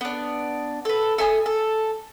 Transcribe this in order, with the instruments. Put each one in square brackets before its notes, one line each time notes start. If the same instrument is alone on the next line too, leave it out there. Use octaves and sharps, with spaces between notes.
[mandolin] B3 D4
A4 B4
A4 E5 G#5 D#6
A4